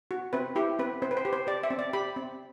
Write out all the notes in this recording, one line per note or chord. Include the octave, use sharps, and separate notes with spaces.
F#4
C4 B4
E4 G4
C4 B4
C4 C5
B4
C5
G4
C5
G4 D5
E5
C4
D5
G4 B5
C4